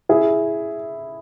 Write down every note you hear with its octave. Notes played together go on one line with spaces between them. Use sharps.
E4 G#4